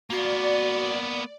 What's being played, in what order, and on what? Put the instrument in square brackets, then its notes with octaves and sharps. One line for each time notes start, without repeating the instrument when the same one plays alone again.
[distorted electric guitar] A#3 B3 [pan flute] F#4 [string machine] D5